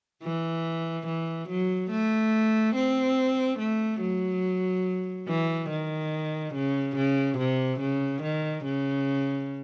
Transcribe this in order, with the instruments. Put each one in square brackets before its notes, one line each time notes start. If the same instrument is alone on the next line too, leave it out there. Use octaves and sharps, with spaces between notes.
[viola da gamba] E3
E3
F#3
A3
C4
A3
F#3
E3
D#3
C#3
C#3
C3
C#3
D#3
C#3